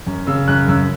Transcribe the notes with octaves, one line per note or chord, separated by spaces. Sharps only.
F#2
C#3 E6
F#2 F#6
F#2 E6